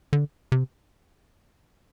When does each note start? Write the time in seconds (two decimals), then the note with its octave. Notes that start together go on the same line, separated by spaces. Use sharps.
0.13 D3
0.52 C3